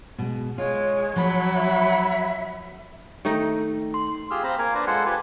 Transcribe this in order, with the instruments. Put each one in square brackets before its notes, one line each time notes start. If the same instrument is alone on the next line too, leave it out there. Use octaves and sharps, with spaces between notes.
[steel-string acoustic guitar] B2 G#3
[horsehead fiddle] G#3 [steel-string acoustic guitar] F4 [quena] C#5
[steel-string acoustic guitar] F3 [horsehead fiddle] F#3 B5
[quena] E5
[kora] D#3 A3 D#4
[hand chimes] C6
[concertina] F4 G4 G#4 C6 E6 F6
C4 C5 F5 A#5 B5
A#3 A#4 F5 G#5
D4 B4 C5 D5 A#5
G#3 F4 A4 C5 F#5 G#5
F4 G4 B4 G#5